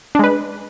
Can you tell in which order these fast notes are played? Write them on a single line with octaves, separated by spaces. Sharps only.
D4 G#3 B4